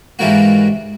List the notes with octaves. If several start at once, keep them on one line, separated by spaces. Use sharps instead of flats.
G#2 E3 G3 A#3 F#4